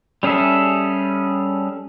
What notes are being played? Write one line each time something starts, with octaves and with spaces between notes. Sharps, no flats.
G3 C#4 G#4 A4 E5